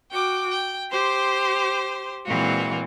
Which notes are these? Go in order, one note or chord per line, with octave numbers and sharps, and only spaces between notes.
F#4 G5 D6
G5
G4 C5 C6
A#2 E3 G#3 C4 F4 F#4